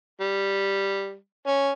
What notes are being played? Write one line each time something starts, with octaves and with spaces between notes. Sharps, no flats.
G3
C#4